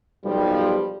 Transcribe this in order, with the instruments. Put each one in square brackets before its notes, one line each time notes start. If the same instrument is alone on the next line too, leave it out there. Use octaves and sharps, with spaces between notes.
[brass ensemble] B1 F3 G3